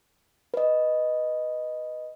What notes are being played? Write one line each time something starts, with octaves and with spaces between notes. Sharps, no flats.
B4 D#5